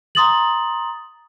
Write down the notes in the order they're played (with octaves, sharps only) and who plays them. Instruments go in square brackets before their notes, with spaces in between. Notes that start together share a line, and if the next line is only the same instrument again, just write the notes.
[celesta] A#5 C6 D#6 A6 F#7